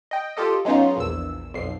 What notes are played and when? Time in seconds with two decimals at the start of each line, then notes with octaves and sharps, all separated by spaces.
0.11 D#5 G5
0.37 F4 G4 A4 D#5
0.65 F#3 G#3 B3 C#4 D#4 F4
0.97 A#1 E2 E6
1.54 B1 F2 C7